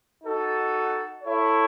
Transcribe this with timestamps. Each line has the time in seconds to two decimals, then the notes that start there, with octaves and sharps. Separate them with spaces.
0.23 D#4 F#4 A4
1.23 E4 A4 C#5